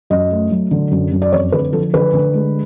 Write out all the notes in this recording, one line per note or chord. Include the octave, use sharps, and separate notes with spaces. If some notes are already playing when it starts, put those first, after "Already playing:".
F#2 D#5
A3
F#3
D3
F#2
F#2
D5
F2 C#5
D3 B4
F3 A4
D3 B4
D3
G#3